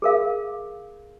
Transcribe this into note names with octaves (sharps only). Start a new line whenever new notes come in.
G#4 A#4 F5